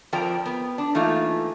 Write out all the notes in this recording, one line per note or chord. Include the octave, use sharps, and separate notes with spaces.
F2 F3 A#4 D5 G5 A#5
B3
D4
E3 A3 A#3 D#4 F4